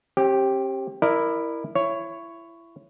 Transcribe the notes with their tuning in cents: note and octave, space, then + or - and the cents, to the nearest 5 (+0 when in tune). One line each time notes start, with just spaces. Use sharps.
C4 +45 G4 +0
E4 +0 A#4 +0 D5 +40
E4 +25 C#5 +0